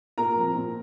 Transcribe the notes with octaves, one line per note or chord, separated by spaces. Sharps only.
A#2 A#4 A#5
F3 C4
A#2